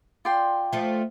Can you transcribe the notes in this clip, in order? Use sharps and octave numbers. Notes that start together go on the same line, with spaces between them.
F4 D5 G5 C6
F3 A3